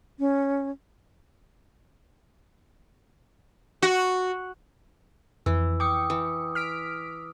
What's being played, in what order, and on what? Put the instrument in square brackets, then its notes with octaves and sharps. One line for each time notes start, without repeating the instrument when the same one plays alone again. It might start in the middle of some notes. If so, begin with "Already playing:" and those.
[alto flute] C#4
[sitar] F#4
[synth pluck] F2 [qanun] E3 [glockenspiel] E6
[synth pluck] G5 C#7 [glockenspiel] D6 D#6
[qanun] E3
[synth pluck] F6 B6 D7